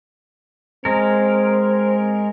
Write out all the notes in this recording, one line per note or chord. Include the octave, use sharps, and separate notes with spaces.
G#3 C4 A#4